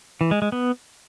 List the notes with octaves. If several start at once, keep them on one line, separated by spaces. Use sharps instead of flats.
E3
G#3
G#3
B3